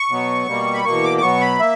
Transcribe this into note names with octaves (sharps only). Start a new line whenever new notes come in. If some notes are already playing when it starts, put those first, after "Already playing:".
Already playing: C#6
B2 F#3 B3
B2 G3 A#3
B5
E2 B2 A#3 C#6
D6
D6
B2 F#3 B3 C#6
B5
A#3 E5